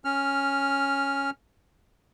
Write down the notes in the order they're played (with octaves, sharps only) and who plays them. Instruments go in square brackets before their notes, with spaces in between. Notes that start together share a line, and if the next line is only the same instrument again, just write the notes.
[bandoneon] C#4 F6